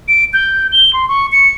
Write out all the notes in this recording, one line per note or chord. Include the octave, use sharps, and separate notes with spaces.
D7
G6
G7
C6
C#6
C#7